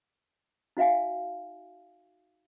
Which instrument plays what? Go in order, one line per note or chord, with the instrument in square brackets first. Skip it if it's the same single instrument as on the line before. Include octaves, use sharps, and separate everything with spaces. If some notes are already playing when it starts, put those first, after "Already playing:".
[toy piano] D#4 F#4 E5 F5 G#5